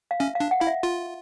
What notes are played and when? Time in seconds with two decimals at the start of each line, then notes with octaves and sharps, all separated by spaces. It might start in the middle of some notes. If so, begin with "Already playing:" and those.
0.11 F5
0.20 C#4 E5
0.35 F5
0.40 D4
0.51 F#5
0.60 E4 F5
0.67 E5
0.83 F4